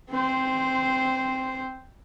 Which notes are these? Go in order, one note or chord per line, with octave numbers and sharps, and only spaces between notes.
C4 C5